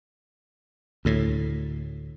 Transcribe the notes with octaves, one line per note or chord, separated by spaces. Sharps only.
D2 A2